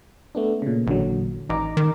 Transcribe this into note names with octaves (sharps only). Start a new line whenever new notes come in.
A3 B3 D4
A#2 C#3
A1 A#2 D3 F#3
A1 D#4 A#5 D6
D#3